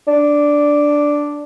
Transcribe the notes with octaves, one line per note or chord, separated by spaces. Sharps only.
D4